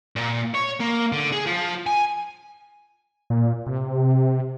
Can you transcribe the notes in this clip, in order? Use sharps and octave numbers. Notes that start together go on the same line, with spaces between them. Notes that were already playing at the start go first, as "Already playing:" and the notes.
A#2
C#5
A#3
D3
G#4
F3
G#5
A#2
C3